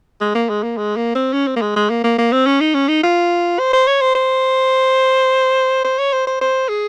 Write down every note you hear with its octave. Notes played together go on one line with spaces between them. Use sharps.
G#3
A#3
G#3
A#3
G#3
A#3
C4
C#4
C4
A#3
G#3
G#3
A#3
A#3
A#3
C4
C#4
D#4
C#4
D#4
F4
C5
C5
C#5
C5
C5
C5
C#5
C5
C5
C5
G#4